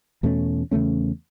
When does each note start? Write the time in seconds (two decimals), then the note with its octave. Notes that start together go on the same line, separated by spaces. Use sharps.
0.23 E2 B2 A3 C#4
0.71 E2 C#3 A3 C#4